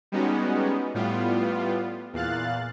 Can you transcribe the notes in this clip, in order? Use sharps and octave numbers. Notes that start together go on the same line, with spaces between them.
G3 G#3 B3 C#4 D#4 F#4
A2 G3 B3 F4
E2 A#2 F5 F#6 A6